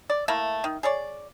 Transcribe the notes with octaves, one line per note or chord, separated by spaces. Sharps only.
D5
A3 A#3 E4
D#3
G#4 C#5 D5